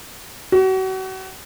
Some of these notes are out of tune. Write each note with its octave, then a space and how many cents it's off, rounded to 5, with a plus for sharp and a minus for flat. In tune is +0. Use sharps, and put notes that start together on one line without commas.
F#4 +35